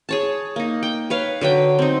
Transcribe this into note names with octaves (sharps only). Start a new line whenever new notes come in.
G#4 C#5 A5
A#3 D#4
G5
B4 C#5 F5
D3 F#3 B4 G5
C4 D#4